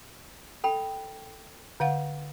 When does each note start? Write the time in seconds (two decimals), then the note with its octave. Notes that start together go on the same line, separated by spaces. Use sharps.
0.64 A4 G5 B5
1.80 D3 F5 F#5